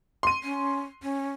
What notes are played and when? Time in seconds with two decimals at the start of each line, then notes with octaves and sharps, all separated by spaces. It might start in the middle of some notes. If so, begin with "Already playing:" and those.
0.23 C6 D#7
0.44 C#4
1.03 C#4